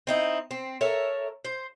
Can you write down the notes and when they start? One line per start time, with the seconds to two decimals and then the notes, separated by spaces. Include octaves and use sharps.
0.07 C4 D#4 E4
0.51 C4
0.81 A4 A#4 C#5 E5
1.45 C5